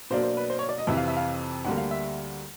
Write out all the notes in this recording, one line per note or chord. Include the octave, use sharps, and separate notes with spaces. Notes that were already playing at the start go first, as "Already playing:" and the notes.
B2 F#3 A#3 D4 C5
C5
B4
C5
C#5
D5
D#5
F2 C3 E3 E5
F5
E5
F5
D2 D3 G3 A#3 F#5
F5
E5